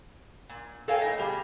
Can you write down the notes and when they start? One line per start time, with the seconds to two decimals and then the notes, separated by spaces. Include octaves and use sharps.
0.49 A#2
0.88 A4 A#4 C#5 F5 G5 G#5
1.01 A2 D#5
1.18 B2 G3 G4 G#4